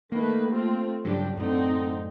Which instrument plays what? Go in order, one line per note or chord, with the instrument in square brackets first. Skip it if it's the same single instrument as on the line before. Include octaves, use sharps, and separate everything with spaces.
[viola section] D#3 A3 B4 [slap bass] A#3
[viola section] A3 C4 F4
[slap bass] G2 C#3 F#3 [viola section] D4 G4
[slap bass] F#2 A2 [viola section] D3 C4 D#4